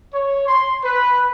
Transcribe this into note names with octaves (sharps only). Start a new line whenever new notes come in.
C#5
C6
B4